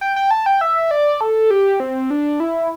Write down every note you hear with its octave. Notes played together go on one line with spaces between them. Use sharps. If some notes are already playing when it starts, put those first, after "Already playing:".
G5
G5
A5
G5
E5
D5
A4
G4
C4
D4
E4